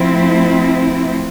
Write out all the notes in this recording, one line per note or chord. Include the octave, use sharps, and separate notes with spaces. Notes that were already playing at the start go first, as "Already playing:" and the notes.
Already playing: F3 A3 C4 E4